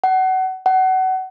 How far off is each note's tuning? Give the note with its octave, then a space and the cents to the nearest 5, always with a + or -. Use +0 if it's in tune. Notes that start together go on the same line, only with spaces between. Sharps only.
F#5 +25
F#5 +25